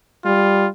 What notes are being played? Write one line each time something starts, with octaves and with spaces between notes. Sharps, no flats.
G3 F4